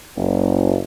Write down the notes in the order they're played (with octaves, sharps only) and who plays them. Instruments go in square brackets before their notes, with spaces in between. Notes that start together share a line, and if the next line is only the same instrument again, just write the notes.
[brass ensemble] F#1